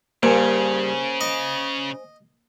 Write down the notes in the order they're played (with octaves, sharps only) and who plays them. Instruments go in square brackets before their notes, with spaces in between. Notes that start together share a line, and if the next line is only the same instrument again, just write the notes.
[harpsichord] G2 [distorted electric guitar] C#3 [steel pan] A#3 [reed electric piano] C5 G#5
[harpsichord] D#5